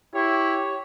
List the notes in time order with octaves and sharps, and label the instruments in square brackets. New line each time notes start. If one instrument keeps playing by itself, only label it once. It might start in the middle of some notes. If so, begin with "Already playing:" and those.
[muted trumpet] E4 [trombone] G4 [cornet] C#5